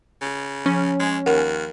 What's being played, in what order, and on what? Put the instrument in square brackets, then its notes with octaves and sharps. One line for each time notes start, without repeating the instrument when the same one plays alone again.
[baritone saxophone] C#3
[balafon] F3 [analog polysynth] C#4
[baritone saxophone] G#3
[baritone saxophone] D#2 [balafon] A#4 F#5